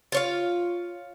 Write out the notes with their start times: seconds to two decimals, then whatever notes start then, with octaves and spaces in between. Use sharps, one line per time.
0.12 F4 C#5 F5